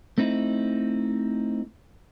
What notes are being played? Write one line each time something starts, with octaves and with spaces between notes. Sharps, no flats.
A3 C4 D#4 E4